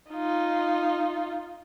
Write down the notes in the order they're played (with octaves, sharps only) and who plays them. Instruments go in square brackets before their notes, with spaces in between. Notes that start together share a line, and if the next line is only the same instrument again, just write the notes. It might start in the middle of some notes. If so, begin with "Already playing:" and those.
[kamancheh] D#4 F4